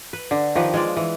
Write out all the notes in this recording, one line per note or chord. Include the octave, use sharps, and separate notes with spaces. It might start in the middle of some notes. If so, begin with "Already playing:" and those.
B4
D3
D#3 F3 G4 B4
G#3 F4 D5
E3